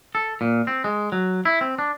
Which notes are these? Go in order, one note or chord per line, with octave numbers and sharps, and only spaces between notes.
A4
A#2
C4
G#3
F#3
E4
C4
D4